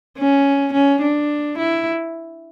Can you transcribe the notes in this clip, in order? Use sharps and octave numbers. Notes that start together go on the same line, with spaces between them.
C#4
C#4
D4
E4